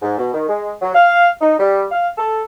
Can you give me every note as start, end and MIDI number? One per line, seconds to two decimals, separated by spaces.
0.02 0.15 44
0.18 0.33 47
0.34 0.46 51
0.49 0.70 56
0.81 0.94 54
0.95 1.29 77
1.41 1.55 63
1.59 1.84 55
1.91 2.07 77
2.18 2.43 69